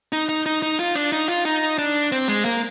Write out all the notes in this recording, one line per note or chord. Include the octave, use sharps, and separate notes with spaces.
D#4
D#4
D#4
D#4
F4
D4
D#4
F4
D#4
D4
C4
G#3
A#3